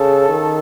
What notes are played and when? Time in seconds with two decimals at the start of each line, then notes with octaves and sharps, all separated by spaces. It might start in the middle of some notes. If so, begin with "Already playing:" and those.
Already playing: C#3 A4
0.29 D#3